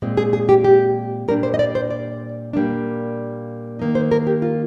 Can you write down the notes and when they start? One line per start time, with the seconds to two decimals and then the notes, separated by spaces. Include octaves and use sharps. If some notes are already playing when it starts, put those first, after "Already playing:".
0.02 A#2 G#3 C4
0.17 G#4
0.33 G#4
0.49 G4
0.64 G4
1.28 A#2 G3 D4 A#4
1.43 C5
1.54 D#5
1.59 D5
1.75 C5
1.91 D5
2.53 A#2 G3 A#3 D4
3.79 D#3 A#3 D#4
3.95 C5
4.11 A#4
4.27 G4
4.42 F4